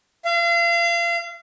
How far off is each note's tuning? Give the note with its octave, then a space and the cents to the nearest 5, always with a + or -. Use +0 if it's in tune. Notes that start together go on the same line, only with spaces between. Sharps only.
F5 -35